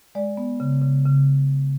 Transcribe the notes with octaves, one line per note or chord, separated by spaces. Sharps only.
G#3 D5
B3
C#3
C#3
C#3